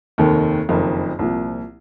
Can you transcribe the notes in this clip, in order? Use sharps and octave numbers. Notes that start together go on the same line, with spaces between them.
F1 D#2 D#3
F#1 F2 D#3
C2 A#2 F3